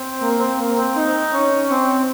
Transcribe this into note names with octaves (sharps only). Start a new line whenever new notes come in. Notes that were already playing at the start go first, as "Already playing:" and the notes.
Already playing: C4
A#3
C4
A#3
C4
D#4
C#4
C4